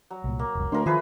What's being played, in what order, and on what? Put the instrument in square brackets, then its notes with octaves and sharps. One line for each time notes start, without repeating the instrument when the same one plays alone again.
[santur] F#3
[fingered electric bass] C2 A#2
[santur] A#3
[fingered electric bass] F1 C2
[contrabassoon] D2 [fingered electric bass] D4 [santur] A#4 C6
[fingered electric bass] D#3 [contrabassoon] F3 [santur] E4 G#4 B4